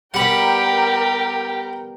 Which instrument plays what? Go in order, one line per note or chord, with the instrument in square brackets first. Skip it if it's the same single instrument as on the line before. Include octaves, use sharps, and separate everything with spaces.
[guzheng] G3 B3 [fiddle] G4 [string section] A#4 G5 [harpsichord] F#5 B5